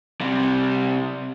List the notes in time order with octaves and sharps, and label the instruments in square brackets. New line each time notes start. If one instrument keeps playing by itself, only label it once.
[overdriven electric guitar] C3 G3